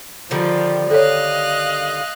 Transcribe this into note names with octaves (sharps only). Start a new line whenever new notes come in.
D3 D#3 F3 G3
A4 C#5 D#5 F5 F#6